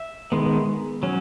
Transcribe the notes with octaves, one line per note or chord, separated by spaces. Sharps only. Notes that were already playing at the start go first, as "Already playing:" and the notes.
Already playing: E5
D#3 G#3 B3
F#3 C#4